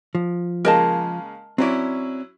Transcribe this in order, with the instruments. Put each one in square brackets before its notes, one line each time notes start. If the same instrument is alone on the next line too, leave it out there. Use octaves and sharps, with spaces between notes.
[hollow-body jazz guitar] F3
[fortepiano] C#3 G#3 A#3 [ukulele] A#4 D#5 A5
[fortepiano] F#3 C#4 E4 [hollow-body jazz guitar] C4 D5